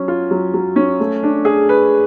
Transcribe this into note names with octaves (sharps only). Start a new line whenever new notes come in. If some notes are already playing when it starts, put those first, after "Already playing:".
Already playing: F#3 C#4
F4
F#3
F#3
C#4
A3
D4
G#4
B4